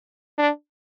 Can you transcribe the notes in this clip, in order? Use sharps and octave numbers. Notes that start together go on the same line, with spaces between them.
D4